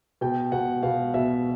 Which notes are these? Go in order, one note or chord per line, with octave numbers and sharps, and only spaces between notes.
B2 G5
B2 F#5
B2 F5
B2 E5